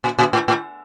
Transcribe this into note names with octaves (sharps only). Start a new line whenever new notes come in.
A#2
A#2
A2
A2